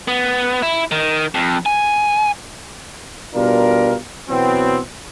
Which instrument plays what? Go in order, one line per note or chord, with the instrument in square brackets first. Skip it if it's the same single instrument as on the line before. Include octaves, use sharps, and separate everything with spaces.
[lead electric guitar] B3
E4
D#3
F2
G#5
[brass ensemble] B2 G3 D4 F4 A#4
B2 E3 F#3 B3 C4